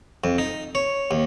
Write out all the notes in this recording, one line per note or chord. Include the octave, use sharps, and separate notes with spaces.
F2
D#4
C#5
D#2